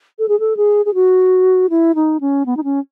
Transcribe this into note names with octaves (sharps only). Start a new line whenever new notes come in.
A4
G#4
A4
G#4
G#4
F#4
E4
D#4
C#4
B3
D#4
C#4